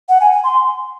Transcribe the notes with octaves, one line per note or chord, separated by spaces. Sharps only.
F#5
G#5
G#5
C6